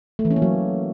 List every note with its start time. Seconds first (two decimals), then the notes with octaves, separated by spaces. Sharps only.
0.19 A3
0.25 E3
0.31 C#4
0.36 A#3
0.42 F#3